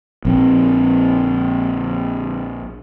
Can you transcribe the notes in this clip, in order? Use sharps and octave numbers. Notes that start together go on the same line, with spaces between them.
A#1 C4